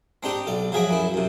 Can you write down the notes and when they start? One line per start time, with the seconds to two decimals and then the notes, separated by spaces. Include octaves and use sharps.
0.23 C4 D4 D#4 G4
0.47 B1 D5
0.72 F3 F#3 G#4 E5 D6
0.91 F#2 E4
1.14 F#2 C3